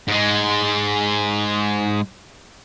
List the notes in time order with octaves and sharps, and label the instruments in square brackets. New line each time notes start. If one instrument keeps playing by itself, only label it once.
[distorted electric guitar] G#2 G#3